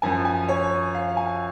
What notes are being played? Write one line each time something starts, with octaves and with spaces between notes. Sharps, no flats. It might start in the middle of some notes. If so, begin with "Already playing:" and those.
F#2 F3 G#5
G#5
C#5
F5
G#5